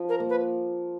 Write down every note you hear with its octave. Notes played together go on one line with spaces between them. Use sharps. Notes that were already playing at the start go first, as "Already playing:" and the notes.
Already playing: F3
A#4
A#3
B4